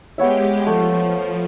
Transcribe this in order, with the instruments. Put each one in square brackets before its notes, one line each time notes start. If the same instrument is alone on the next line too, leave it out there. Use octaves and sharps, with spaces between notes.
[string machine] G#3 G4 [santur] B3 C#5 E5
[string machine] F3 [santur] A3